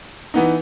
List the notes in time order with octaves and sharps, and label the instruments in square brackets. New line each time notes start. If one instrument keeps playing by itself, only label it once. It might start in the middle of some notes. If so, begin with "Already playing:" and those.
[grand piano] E3 B3 D#4